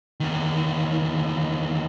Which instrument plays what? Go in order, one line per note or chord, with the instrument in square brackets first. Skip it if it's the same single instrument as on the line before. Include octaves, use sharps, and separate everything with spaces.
[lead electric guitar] E2 D#3